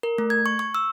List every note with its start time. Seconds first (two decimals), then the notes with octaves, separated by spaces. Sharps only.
0.03 A#4
0.18 A3
0.30 G#6
0.46 C#6
0.59 C#6
0.75 E6